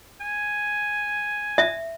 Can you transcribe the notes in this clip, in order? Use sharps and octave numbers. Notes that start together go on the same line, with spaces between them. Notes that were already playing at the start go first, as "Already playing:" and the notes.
G#5
E5